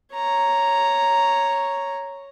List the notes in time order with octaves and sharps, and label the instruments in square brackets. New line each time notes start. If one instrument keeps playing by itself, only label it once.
[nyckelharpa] C#5 A#5